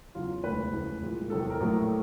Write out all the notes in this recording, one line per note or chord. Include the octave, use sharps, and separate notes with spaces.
E2 C#3 F#3 F4
E1 D2 C3 E3 B4
F1 E2 C#3
C2 A#2 F3 G#3
E2 C3 D#3 F#3 A4
A4
A#4
A#1 A2 F#3 A3